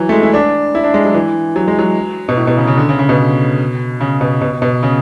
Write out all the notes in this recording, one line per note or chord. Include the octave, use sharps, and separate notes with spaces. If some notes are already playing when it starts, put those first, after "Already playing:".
Already playing: E3 F#3
A3
G#3
E4
D4
E4
D4
G#3
F#3
E3
F#3
G#3
F#3
B2
A2
B2
C#3
C#3
D3
C#3
C#3
B2
C#3
B2
B2
B2
C#3